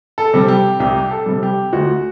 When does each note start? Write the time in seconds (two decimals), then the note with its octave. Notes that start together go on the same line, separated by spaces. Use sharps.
0.18 A4
0.34 C3 G3
0.48 G4
0.80 C2 G4
1.11 A4
1.26 C3 G3
1.43 G4
1.73 D2 F#4